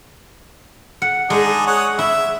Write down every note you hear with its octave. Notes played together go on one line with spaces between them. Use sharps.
F#5
G#3 D4 D#4 G#4
C#5 F#5 D#6
E4 E5